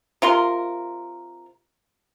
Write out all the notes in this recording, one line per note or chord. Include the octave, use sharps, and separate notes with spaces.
C3 F4 A#4 C6